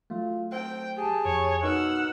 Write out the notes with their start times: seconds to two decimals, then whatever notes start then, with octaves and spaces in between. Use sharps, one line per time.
0.10 F#3 A3 F4
0.52 C4 G5
0.97 G4 G#4 A5
1.25 F2 C#5
1.63 B2 D#4 A#4 D#5 F#5 E6 F6